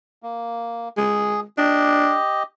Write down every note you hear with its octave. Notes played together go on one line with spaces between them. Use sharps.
A#3
G#3 G#4
D4 G4 D#5